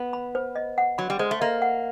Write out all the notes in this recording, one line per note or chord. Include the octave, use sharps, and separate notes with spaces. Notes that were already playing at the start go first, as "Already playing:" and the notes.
Already playing: B3
B5
C5
D#5
F#5
F#3 B5
G3
G#3 C5
A3
A#3 D#5
F#5